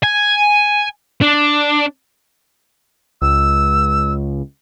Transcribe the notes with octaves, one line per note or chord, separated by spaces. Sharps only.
G#5
D4
C#2 E6